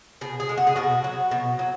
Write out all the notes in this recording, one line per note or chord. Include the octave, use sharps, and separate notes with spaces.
B2 G#4
G#4
G#3
F#4
G#4
B2 F#4
F#3
B2
F#3